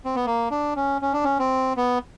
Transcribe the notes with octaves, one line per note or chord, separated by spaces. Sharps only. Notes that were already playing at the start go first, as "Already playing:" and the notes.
C4
B3
A#3
D4
C#4
C#4
D4
C#4
C4
B3